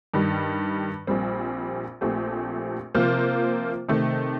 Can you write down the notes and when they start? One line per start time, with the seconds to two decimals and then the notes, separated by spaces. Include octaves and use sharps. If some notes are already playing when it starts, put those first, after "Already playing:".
0.14 G2 D#3 G3
1.07 A#1 A#2 G3 C4
2.01 A#1 A#2 A3 C4 G4
2.95 C3 F3 A#3 F4 C5
3.89 C3 D#3 A3 C4